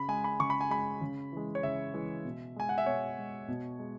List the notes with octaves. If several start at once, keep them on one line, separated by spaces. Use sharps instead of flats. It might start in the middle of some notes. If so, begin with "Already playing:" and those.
Already playing: C#3 B5
G#3 G#5
B5
C#3 C#6
B5
G#5
G#3 B5
C#3
E3 G#3
C#5
C#3 E5
E3 G#3
B2
G#3 G#5
F#5
E5
B2 C#5
G#3
B2
G#3